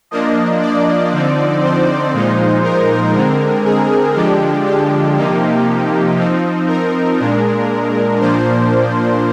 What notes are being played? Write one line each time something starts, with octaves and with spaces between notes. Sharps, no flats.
F3 A#3 D4 D#5
D5
D3 F3 C4 D#4
C5
A#2 F3 G#3 D#4
A#4
D3 G#3 C4
G#4
D3 F3 G#3 D4 G4
G4
C3 F3 A#3 D#4
F3 C4 D#4
A#4
A#2 G#3 D4
A#2 F3 A#3 D4 C5